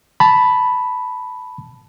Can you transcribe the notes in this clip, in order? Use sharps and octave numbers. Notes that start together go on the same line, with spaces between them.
A5 B5